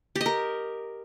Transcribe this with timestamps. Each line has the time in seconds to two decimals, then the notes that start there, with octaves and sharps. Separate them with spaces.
0.16 G4
0.21 D#5
0.26 A#4